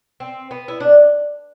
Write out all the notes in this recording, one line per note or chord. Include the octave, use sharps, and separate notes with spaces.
C4
B3
E4
D4